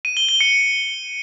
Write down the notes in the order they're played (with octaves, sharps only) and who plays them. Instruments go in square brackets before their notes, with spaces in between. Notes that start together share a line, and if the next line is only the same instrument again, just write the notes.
[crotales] D#7
G7
G7
C#7